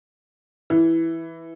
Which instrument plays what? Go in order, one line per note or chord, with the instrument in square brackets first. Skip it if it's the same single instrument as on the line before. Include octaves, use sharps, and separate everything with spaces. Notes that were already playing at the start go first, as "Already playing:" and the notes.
[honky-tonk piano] E3